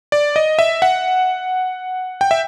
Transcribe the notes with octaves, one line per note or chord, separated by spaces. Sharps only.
D5
D#5
E5
F#5
G5
E5